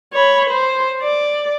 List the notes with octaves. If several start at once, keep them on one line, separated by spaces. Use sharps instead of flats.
C#5 B5
C5
D5